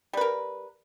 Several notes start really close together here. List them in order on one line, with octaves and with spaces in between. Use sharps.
G3 B4 A#4